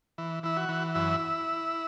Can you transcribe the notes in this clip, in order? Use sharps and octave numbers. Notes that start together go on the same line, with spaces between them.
E3
E3 E4
F#4
E3
F#2 E4